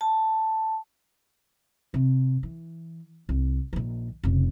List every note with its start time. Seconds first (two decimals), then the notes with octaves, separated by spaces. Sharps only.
0.01 A5
1.94 C3
2.43 E3
3.29 C2
3.73 A#1 D#3
4.24 F1 C#3